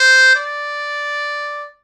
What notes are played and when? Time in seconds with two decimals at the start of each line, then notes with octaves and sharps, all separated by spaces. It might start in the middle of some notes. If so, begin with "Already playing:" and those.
Already playing: C5
0.35 D5